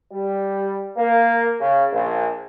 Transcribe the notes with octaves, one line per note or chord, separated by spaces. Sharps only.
G3
A#3
C#3
A#1